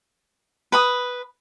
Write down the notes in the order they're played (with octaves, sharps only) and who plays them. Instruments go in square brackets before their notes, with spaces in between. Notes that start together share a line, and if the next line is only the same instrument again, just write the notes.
[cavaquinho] B4 B5 D#6